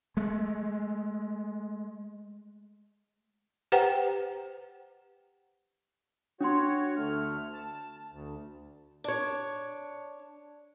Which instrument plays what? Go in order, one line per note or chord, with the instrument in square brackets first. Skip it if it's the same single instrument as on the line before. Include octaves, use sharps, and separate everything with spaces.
[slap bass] G#3 A3
[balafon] G4 B4 C5 F#5 G5 A#5
[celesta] D4 C6 [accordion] F#4 C#5
[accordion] D2 A3 F6
A5
D2
[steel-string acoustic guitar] D4 C#5